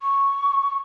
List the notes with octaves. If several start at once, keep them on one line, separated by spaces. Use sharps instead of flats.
C#6